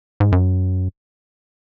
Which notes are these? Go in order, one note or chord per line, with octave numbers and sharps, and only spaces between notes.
G#2
F#2